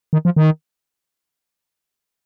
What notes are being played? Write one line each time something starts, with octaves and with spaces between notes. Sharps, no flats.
D#3
F3
D#3